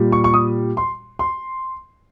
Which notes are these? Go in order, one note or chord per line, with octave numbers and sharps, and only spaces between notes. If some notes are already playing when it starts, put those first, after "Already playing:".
Already playing: A#2 G3
C#6
C#6
D#6
C6
C6